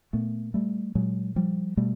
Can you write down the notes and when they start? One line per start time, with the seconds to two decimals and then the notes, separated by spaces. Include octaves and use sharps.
0.13 A#2 A3 B3
0.54 G3 A3
0.95 A#2 F#3 G#3
1.36 F3 G3
1.77 B2 G3 A3